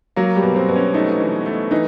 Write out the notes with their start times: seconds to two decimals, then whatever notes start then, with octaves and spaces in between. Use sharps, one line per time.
0.16 F#3 A#3
0.36 G3
0.43 B2
0.56 C4
0.68 B2
0.75 C#4
0.94 A3 D#4
1.20 E3
1.46 A3
1.71 E3 D#4